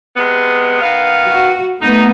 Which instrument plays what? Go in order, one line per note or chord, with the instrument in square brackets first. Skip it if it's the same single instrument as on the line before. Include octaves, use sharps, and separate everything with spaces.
[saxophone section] C3 G#3 B3
D#3 B3 F5
[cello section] F#4
[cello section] A3 B3 [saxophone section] D#4